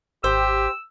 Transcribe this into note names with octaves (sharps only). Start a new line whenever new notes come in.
G#1 G4 C5 E6